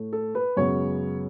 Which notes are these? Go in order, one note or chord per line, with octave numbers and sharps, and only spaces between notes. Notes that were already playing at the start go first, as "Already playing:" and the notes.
Already playing: A2 A3
A4
B4
F#2 C#3 G#3 B3 C#5